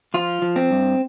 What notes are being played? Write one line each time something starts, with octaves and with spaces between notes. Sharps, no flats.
F3 F4
F3
C4
G2